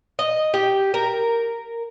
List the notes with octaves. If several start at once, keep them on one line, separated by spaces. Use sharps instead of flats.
D#5
G4
A#4